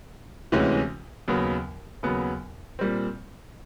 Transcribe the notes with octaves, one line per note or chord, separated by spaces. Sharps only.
D2 C3 E3 G#3 C#4
D#2 C#3 F#3 B3
D#2 C#3 F#3 B3
A#2 G3 C4